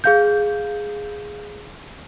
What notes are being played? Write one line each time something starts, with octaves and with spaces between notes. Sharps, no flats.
G#4 F5 G6